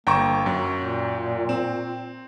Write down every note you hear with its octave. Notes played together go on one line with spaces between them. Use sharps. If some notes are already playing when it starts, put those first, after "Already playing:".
G1 A#3 G5 A#5 C#6 E7
F#2 F#3
A#2
C4 E7